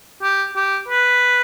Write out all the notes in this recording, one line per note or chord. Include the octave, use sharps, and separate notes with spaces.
G4
G4
B4